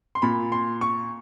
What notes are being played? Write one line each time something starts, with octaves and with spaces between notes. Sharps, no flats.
C6
A#2 B5
C6
C#6